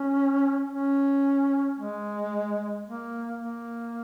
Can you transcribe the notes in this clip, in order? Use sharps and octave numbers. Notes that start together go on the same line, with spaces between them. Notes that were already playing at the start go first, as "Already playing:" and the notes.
Already playing: C#4
C#4
G#3
A#3
A#3